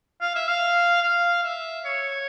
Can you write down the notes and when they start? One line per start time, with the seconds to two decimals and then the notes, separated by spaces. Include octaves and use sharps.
0.21 F5
0.35 E5
0.48 F5
1.03 F5
1.43 E5
1.85 C#5